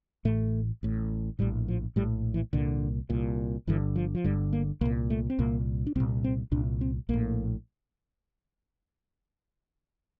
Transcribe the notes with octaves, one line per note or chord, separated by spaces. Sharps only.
A1 A2 A3
A1 A2
A#1 A2 G3
F3
A#1 A2 G3
E3
C2 A#2 D3
C2 A#2
G1 G2 D3 E3
F3
F3
G1 G2 D3 G3
A#3
C2 A#2 A#3
A3
C4
C2 A#2 A#3
D4
C2 A#2 C4
C4
C2 A#2 D4
C4
A#1 A2 A#3